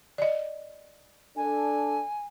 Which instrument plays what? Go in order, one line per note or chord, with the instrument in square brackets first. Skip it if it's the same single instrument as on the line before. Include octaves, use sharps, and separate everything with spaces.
[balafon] D5 D#5
[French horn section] D4 A4 [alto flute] G#5